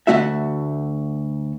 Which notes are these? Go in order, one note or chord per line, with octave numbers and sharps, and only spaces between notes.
D2 G#2 A3 F#4 E5